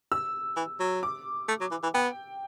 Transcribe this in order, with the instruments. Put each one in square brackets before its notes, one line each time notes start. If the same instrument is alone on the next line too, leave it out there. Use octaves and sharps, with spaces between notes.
[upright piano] E6
[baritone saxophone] E3
F#3
[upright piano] D6
[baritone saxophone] A3
F#3
E3
E3
[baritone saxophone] B3 [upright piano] G5